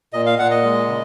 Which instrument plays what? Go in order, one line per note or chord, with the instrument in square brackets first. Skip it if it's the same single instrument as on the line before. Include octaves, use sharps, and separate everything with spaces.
[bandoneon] A#2 D#5
F5
A#2 F#5
D#5
G#3
C#3